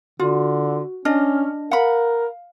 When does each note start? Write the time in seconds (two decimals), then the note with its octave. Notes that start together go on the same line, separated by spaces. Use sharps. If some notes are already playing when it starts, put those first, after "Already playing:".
0.20 D3 F4 F#4
1.05 C#4 D4 D#5 F6
1.71 A#4 F5 F#5 B5